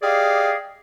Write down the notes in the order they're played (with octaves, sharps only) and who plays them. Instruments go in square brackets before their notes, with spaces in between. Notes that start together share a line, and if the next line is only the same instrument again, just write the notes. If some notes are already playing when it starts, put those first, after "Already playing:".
[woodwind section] G4 G#4 D5 D#5 F5